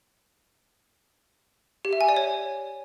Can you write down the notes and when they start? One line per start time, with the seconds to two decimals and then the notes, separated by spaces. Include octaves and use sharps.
1.85 G4
1.93 E5
2.01 G#5
2.09 D5
2.17 C#5